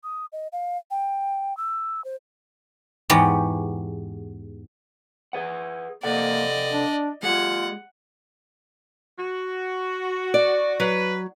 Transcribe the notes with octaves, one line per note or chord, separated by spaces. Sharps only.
D#6
D#5
F5
G5
E6
C5
E2 G#2 B3 G4 C#5 G5
G#4 B4 F#5
C3 A#3 A4 D5 D#5 F#5
D4
G#3 F4 G4 G#4 F#5
F#4
D5
F#3 B4